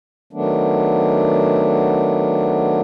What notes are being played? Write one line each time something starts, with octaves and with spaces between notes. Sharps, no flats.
D#3 F#3 A3 B3 D4